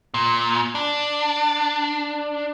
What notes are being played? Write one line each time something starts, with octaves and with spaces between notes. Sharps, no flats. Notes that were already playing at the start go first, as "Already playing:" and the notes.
A#2
D4